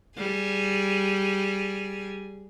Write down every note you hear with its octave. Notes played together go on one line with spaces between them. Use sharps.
G3 G#4